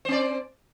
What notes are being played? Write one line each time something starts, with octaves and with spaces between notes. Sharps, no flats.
C4 C5 D5